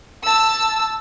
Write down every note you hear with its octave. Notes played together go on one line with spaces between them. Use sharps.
A5 E6